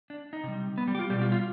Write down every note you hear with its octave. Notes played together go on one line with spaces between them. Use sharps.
D4
D#4
C3 G3
B3
G3
G4
F4
B2 G3 G4
F4
F4